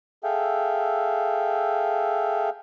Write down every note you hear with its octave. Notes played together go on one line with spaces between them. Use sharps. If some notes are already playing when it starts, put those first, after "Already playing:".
G#4 A4 E5 F5 G5